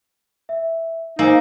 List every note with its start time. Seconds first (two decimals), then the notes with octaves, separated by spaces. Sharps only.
0.49 E5
1.19 A#3 D#4 C5 G#5 E6